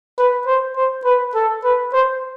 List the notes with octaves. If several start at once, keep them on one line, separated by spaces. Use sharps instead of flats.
B4
C5
C5
B4
A4
B4
C5